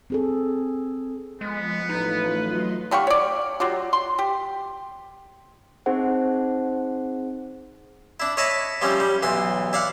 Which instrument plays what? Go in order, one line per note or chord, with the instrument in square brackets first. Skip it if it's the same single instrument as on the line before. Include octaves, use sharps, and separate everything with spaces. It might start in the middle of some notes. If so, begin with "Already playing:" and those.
[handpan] C4 G#4 A4
[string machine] F3 [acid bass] G#3 [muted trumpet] B3
[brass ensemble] A1 B4 [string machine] A3 F4 [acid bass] D#4
[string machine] F#3 D#5 C6
[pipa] D3 G4 F5 C#6
C#5 D5
F#3 F4 G4
C6
G4
[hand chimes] C4 D#4 G#4 C5 F#5
[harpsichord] D4 E4
C#5 D#5 E5 A5 B5
F3 G3 C#4 E4
G3
B1 E3 C6
E4 D5 F5 F#5